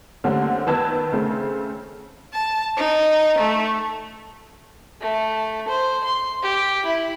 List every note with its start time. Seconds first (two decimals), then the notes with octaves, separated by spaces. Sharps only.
0.24 D3 G3 A3 A#3 C4 C#4
0.67 D#3 B3 B4 A5 E6 G#6
1.12 C#3 A3 C4
2.32 A5
2.77 D#4
3.39 A3
5.01 A3
5.68 C5
6.04 C6
6.42 G4
6.86 E4